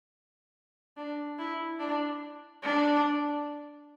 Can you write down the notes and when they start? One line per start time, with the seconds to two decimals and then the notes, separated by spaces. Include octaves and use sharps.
0.97 D4
1.39 E4
1.79 D4
2.63 D4